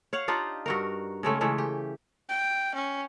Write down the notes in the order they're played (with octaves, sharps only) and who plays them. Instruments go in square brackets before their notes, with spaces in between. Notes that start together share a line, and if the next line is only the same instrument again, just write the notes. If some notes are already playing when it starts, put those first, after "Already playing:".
[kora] C#5 F5 F#5
D4 D#4 F4 G4
G2 F#4 A#4
C#3 G#3 A3 C#4
C#3 E3 G#3 A3
G4
[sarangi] G5
C#4